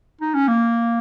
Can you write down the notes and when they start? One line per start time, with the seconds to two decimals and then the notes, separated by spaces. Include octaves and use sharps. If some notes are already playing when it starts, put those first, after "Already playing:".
0.21 D#4
0.34 C#4
0.48 A#3